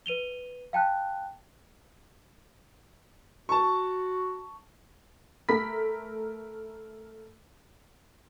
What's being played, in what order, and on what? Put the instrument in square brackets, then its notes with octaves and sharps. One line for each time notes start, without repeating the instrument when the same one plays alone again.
[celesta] B4 D#7 F7 G7
F5 G5 A5 F#6
[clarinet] F#4 [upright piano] A5 C#6
[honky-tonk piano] A3 A#4 B5 B6